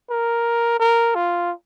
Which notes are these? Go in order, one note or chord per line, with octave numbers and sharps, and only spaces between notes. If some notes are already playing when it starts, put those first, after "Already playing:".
A#4
A#4
F4